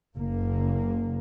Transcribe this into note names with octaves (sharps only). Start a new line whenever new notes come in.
F#1 A#3